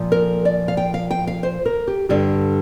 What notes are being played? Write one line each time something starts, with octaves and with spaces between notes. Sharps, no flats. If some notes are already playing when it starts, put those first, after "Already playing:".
Already playing: A#2 F3
A#4
D5
F5
G5
F5
G5
F5
C5
A#4
G4
G2 D3 G3 G4